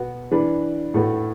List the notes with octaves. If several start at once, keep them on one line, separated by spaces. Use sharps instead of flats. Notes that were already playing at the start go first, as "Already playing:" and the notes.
Already playing: B2 B3 F#4
E3 D4 B4
A2 A3 F#4 B4